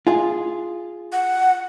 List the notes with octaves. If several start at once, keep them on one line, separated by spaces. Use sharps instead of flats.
F4 G#4
F#5